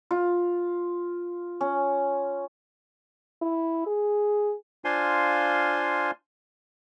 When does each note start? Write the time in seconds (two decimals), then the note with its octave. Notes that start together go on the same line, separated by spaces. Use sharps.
0.11 F4
1.61 C#4
3.42 E4
3.86 G#4
4.85 D4 F4 C5 F5 G#5 C6